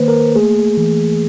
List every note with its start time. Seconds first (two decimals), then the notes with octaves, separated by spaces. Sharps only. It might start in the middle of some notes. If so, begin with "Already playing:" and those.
Already playing: D#3 A#3 B4 C5
0.08 A#4
0.36 A3 G#4
0.77 E3